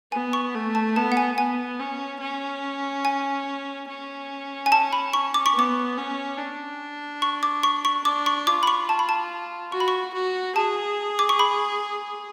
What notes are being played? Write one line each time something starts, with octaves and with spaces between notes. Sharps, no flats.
B3 G#5
C#6
A3
A5
B3 A5
F#5
G#5
B3 G#5
C#4
C#4
G#5
C#4
G#5
A5
B5
C#6
D6
C#6
B3 D6
C#4
D4
C#6
D6
C#6
C#6
D4 D6
C#6
F4 D6
B5
C#6
A5
B5
A5
F#4 C#6
B5
C#6
F#4
G#4 A5
D6
C#6
B5